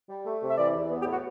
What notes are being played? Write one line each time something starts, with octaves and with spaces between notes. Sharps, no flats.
G3
A3
C3
E5
E3 D5
E2
B3
G4
A2
F#4